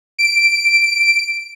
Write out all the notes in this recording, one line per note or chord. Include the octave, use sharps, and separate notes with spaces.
D7